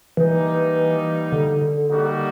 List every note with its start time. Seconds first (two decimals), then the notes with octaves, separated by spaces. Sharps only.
0.17 E3 G3 A#3 D#4
1.32 D3
1.61 D3
1.90 D3 G3 A#3 D#4 F#4